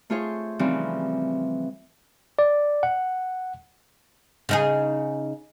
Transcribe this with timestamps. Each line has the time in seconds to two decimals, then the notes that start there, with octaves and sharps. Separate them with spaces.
0.10 A3 F4 G#4 C5 C#5
0.59 C#3 E3 F3 G3 C4 D#4
2.39 D5
2.83 F#5
4.49 C#3 D#4 G#4